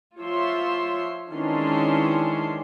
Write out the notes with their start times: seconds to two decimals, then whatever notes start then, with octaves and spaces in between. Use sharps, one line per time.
0.19 F3 F4 C#5 E5 C6
1.33 D#3 E3 G#3 C#4 D4 C6